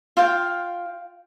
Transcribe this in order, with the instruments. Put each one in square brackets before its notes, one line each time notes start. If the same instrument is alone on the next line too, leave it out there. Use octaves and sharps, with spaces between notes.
[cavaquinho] F4 F5 G5